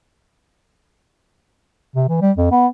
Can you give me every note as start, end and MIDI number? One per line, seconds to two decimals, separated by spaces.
1.95 2.06 48
2.09 2.21 52
2.22 2.31 55
2.37 2.49 41
2.52 2.67 59